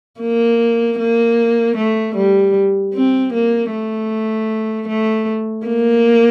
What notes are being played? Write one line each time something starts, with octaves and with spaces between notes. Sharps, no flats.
A#3
A#3
A3
G3
C4
A#3
A3
A3
A#3